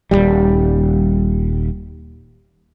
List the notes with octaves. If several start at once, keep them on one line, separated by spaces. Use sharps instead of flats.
D#1 B1 G3